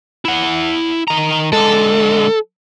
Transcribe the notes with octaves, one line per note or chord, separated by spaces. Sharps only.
E4 F#5
D#3 A#5
D3 G#3 A4